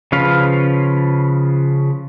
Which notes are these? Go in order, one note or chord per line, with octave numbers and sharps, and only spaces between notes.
C#3 F3 C#4 B4 F5